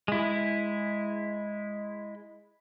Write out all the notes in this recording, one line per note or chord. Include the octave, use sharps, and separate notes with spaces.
G#3 E4